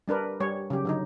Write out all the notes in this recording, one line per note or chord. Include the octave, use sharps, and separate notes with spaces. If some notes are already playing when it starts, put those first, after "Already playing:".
G3 D4 A#4 B4
G3 C#5
C#3 F#3 G4
D3 F#3 D#4